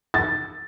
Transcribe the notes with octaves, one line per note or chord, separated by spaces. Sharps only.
A6